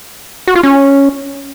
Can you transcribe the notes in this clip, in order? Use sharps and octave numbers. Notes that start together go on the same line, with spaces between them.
F#4
F4
C#4